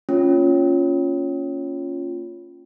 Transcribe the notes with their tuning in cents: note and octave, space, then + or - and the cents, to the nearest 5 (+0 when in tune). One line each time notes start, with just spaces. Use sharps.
A#3 -15 C#4 +0 F4 +0